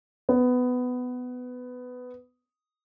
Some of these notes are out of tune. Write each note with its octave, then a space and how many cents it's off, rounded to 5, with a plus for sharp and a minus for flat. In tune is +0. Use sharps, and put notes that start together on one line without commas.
B3 +15